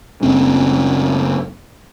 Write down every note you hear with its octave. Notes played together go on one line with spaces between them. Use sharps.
F#1 C4 C#4